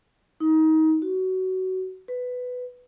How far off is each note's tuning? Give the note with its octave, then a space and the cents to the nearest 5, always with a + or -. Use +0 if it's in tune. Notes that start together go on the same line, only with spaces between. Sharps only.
D#4 +25
F#4 +20
B4 +10